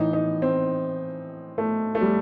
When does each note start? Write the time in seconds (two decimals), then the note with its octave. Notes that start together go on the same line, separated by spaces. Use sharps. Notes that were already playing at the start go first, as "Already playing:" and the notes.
Already playing: A2 E3 D#4
0.13 D#4
0.42 C4
1.58 A3
1.95 A3
2.01 G3